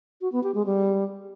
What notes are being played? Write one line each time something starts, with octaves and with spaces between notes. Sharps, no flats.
F#4
B3
G4
G#3
G3